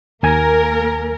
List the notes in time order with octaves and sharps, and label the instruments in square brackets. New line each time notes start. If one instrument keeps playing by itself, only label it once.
[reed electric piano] D#2 G#5 G#6 [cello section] A#3 A#4